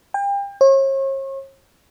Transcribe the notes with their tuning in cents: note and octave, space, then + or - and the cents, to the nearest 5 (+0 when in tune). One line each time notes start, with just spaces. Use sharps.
G5 +35
C#5 -40